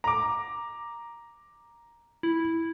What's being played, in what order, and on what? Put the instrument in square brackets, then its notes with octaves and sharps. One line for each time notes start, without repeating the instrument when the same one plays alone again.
[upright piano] A#5 D6
[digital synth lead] E4